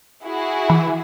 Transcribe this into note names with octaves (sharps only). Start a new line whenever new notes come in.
E4 F#4 G#4
E3